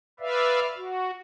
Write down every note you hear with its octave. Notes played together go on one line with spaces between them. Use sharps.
B4 D5 E5 F5
F#4